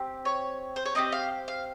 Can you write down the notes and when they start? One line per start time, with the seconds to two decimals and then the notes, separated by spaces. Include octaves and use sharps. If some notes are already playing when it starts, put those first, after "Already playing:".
Already playing: C4 G4
0.25 C#5
0.76 C5
0.85 C#5
0.95 C4 D#4 G4 D#5
1.12 F5
1.48 F5